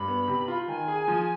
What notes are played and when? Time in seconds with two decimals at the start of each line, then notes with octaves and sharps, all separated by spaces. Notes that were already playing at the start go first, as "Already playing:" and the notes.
Already playing: G2 B5
0.08 B3
0.28 C3
0.48 F4
0.68 D#3 G#5
0.88 G#4
1.08 F3